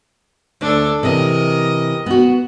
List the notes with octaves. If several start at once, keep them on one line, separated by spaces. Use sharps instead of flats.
D2 D4 A4 C#5
C3 E3 A#4 D#5
B3 F#4